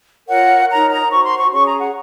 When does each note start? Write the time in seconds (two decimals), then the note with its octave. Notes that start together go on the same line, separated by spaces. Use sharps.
0.27 F4 A#4 C#5 F#5
0.69 D#4 A#4 C#5 A#5
0.90 A#5
1.10 F#4 C5 C#6
1.24 C6
1.38 C#6
1.52 C#4 G#4 C#5 C#6
1.65 A#5
1.79 F#5